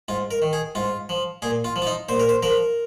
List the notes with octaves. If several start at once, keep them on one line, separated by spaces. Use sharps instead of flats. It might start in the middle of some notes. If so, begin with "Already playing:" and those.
G#2 F4
A#4
D#3
G#4
G#2 F4
F3
A#2 G#4
F4
F3
F4
D#4
A#2 C5
A#4
C5
F3 A#4